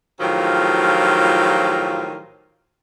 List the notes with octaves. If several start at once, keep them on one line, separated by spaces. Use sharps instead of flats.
A2 D#3 F3 F#3 F4 G4